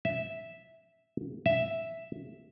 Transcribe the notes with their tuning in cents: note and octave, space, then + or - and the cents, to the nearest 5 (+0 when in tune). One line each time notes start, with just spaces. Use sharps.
E5 -5
E5 +0